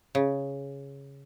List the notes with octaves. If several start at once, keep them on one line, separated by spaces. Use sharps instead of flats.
C#3